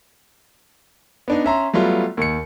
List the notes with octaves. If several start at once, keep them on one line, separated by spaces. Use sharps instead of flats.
B3 D4 D#4
C#4 E5 A#5 C6
F#3 G3 A3 B3 F4
D#2 C#7